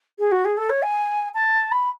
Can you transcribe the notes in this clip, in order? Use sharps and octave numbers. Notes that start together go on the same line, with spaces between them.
G#4
F#4
G#4
A4
C#5
G#5
A5
B5